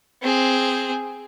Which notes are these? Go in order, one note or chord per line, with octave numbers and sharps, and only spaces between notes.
C4 G#4